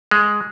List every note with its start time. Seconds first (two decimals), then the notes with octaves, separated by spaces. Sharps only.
0.11 G#3